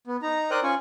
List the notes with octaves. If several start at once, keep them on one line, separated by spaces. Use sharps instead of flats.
B3
D#4 A#5
A#4 C5 D5 G5 D#6 F#6
C#4 F4 G#5 C#6